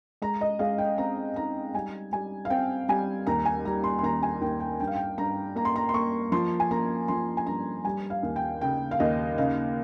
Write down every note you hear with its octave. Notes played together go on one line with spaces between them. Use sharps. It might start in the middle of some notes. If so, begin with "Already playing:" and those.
G#3 A#5
D#5
G#3 F5
G5
C4 A#5
D#4 A#5
G3 G#5
G3 G#5
F5
C4 G5
G3 G#5
D#2 A#5
G#5
G3 A#5
C6
C6
D#2 A#5
G#5
D#2 G5
G5
G2 G5
F5
G5
G2 A#5
A#3 A#5
C6
A#5
C6
A#3 C#6
F3 C6
G#5
A#3 A#5
F3 C6
G#5
G2 A#5
G3 G#5
F5
D#2
G5
C#3 G5
F5
D#2 D#5
C#3 F5